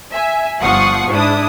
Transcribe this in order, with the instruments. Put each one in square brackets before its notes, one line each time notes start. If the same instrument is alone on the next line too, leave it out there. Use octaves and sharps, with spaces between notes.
[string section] E5 G#5
G1 F3 F#5 C#6 D#6 C7
G#2 D4 E4 D#6